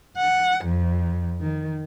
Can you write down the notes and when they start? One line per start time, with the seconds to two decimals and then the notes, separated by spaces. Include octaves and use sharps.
0.17 F#5
0.64 F2
1.39 D#3